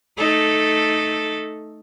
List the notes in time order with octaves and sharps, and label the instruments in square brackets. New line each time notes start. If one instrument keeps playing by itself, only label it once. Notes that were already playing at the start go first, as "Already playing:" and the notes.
[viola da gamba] A3 D#4 A4